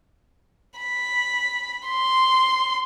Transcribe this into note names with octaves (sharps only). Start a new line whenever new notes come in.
B5
C6